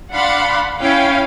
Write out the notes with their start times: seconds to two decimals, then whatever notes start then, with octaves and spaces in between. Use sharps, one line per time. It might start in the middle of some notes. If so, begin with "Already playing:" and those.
0.13 D4 F5 F#5 B5 C6
0.80 C#4 E4 F5 G5